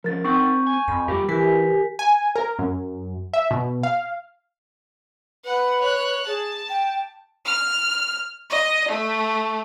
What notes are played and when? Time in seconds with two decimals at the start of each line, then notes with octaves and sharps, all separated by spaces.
0.04 F3 C#4 A#4 A6
0.24 C4 D#4 F#5 C#6 G6
0.67 G#5
0.88 F2 B5
1.08 G3 F4 G4 A#4
1.29 E3 E4 G4 A#4 G#5 B6
1.99 G#5
2.36 A#4
2.59 F#2
3.34 E5
3.51 B2
3.83 F5
5.45 B4 F#5
5.81 C#5 F#6
6.27 G#4 A5
6.70 G5
7.46 F6
8.50 D#5
8.89 A3